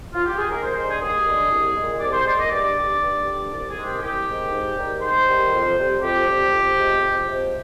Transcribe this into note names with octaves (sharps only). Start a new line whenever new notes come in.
F4
G4
G#4
D#2 A#4
C5
D3 G#3 C5
G#4
D#2 G#4
D3 G#3
C2
A#2 G#3
C2 D5
C5
A#2 G#3 D5
D#5
G2 D5
D3 G3
G2
D3 G3
C2 D5
G#4
C3 D#3 G#3
G4
C2 G4
C3 D#3 G#3
G#2
D#3 G3
G#2 C5
D#3 G3
F2
C3 G3
F2 G4
C3 G3
F2
C3 F3 G#3
F2
C3 F3 G#3